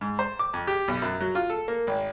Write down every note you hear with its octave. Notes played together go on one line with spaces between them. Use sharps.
G#2
C5
D6
F2
G4
B1
F#2
F#3
F4
A4
A#3
G#1